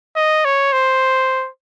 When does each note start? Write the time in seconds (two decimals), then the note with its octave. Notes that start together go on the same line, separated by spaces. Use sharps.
0.16 D#5
0.45 C#5
0.73 C5